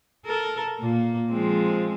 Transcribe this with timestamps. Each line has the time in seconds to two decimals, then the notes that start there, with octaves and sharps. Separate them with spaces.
0.25 A4 A#4
0.80 A#2 A#3
1.30 F3 G#3 C4